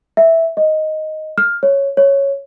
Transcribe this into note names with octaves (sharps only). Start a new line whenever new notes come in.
E5
D#5
F6
C#5
C#5